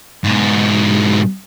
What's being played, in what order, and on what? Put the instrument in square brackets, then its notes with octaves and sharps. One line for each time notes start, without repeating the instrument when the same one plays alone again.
[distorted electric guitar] G#2 B2